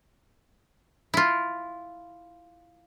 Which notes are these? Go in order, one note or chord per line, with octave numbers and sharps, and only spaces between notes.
E4 F4